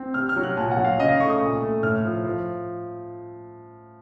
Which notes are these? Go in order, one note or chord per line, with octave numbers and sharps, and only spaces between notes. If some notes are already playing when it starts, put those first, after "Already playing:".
Already playing: C4
C3 F6
F6
F#3
F#6
A#2 A5
F#5
F#3
F5
C#3 D#5
F5
A3 C#6
D#6
A#2
A3
A2 F6
F3
F3